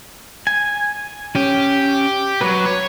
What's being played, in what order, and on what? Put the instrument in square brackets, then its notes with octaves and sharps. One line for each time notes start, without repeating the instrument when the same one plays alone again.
[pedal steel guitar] G#5
[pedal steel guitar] C#4 [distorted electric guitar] G4
[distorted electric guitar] F#3 [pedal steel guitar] B4
[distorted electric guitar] C#5